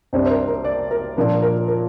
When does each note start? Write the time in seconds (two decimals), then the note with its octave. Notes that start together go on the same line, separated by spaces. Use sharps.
0.13 C2 C3 G3 D4 C5
0.26 C5
0.30 A#4
0.48 A#4
0.64 D5
0.91 A#4
1.17 A#2 F3 A#3 D4
1.42 A#4
1.68 A#4